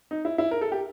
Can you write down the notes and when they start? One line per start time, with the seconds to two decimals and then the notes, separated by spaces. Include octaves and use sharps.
0.11 D#4
0.25 E4
0.38 E4
0.51 A#4
0.61 A4
0.72 G4